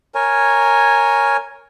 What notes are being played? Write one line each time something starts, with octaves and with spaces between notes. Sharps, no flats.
A#4 C#5 G#5